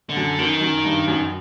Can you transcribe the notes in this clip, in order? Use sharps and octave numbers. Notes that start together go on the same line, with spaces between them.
D3
F#2
F#2 D#3
F#2
G2
F#2